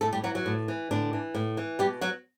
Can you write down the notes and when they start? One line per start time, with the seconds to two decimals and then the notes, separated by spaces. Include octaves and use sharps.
0.01 A2 A3 A4
0.13 G3 G4
0.24 E3 F#3 F#4
0.35 F#3 F#4
0.46 A2
0.68 E3
0.91 A2 D3 D4
1.13 E3
1.35 A2
1.57 E3
1.79 B2 G3 G4
2.01 F#3 F#4